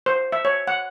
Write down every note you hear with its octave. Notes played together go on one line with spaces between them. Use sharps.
C5
E5
C#5
F#5